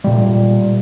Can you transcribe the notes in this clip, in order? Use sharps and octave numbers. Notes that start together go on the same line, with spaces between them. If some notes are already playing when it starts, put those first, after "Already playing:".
A#2 G3